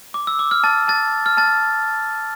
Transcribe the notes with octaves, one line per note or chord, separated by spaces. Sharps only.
D6
E6
D6
F6
A5 A6
A5 A6
F6
A5 A6